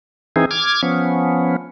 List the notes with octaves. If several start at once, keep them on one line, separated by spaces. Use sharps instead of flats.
E3 C4 D#4 G#4
D6 F6 G#6
F3 B3 C#4